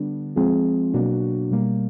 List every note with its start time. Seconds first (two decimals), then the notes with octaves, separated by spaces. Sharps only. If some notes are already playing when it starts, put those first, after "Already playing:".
Already playing: D3 G3 B3 D4
0.36 F3 G#3 C4 F4 G#4
0.93 B2 F#3 A#3 D4 F#4
1.51 B2 G3 A#3